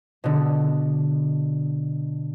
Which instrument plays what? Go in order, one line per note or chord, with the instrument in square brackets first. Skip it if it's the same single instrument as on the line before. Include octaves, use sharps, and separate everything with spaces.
[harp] B2 D3